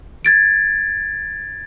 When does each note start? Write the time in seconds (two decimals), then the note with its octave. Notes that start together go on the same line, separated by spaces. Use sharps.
0.25 G#6 A6 D7